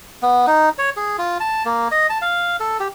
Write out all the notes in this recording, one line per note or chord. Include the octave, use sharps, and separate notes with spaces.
B3
D#4
C#5
G#4
F4
A5
A#3
D#5
A5
F5
A4
G4